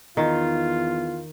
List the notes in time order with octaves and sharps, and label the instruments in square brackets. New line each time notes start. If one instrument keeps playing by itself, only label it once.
[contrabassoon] E2 [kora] D#3 [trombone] F4